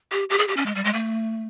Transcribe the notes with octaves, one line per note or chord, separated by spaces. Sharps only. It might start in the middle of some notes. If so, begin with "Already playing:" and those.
G4
G4
G#4
G4
C#4
G#3
G3
G#3
A3